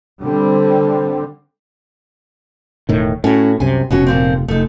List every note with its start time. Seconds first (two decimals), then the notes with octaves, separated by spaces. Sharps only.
0.22 D3 G3 C4
2.89 E1 A2 D#3
3.24 A2 C#4 F#4
3.60 C2 F#2 C3 G#5
3.91 F1 B2 C#4 F#4
4.07 A#2 F3 C4
4.48 F1 A3 D#4